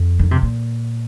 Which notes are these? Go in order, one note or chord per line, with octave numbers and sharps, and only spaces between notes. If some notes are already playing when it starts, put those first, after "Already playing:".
Already playing: F2
D#3
C3
A#2